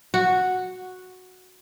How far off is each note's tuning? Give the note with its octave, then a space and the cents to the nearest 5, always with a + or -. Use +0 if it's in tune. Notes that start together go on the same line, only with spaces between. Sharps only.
F#4 -5